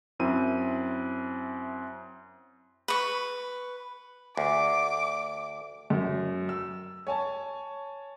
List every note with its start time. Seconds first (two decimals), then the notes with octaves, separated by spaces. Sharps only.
0.19 F#2 C4 E4 D#7
2.88 B4 C#6
4.37 D2 D6
5.90 F#2
6.49 E6
7.07 C#5 G#5 A5